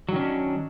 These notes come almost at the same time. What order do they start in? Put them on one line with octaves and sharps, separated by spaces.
F#3 D#3 C#4 D4